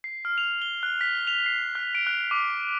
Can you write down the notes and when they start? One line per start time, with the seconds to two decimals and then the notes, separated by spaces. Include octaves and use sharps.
0.04 C7
0.25 F6
0.38 F7
0.62 G7
0.83 F#6
1.01 B6
1.27 F7
1.46 C7
1.75 F#6
1.95 D7
2.07 F#6
2.31 D6